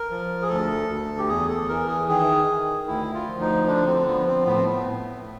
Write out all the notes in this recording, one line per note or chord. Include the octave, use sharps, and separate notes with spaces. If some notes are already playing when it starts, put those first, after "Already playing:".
Already playing: A#4
F3
G#4
D2 A4
D2
G4
E2 G#4
A4
E3 A#4
G#4
D#3 G#4
D#3
D2 E4
F4
F3
D#4
D3 D4
C4
F3 B3
C4
A2 B3
C4
B3
A2